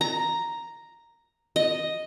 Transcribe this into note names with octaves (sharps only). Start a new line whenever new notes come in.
A#5
D#5